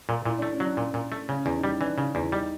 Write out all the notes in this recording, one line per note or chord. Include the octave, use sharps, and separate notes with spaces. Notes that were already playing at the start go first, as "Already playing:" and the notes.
A#2
A#2 E4
A3 D4
C#4
F#3 D4
A#2
A#2
A3
C#3 C#4
E2
D#4
G3 E4
E3 D4
C#3
E2
E4
G3 D#4